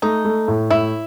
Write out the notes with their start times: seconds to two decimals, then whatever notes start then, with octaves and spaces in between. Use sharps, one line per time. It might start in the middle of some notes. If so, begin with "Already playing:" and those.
0.02 A3 D#4
0.25 A3
0.48 A2
0.70 A2 E4